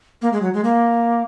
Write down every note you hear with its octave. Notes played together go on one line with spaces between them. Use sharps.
A#3
G#3
F#3
G#3
A#3